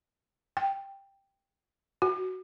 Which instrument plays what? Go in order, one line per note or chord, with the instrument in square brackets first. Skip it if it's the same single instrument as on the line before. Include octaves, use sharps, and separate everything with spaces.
[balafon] G5
F#4